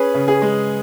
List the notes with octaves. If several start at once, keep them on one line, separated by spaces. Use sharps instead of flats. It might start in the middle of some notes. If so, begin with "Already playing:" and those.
Already playing: C#4 G#4 B4
C#3
G#4
G#3